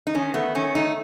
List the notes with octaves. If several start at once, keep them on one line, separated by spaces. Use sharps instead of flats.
D#4
D#3 C#4
A3 B3
D#3 C#4
A3 D#4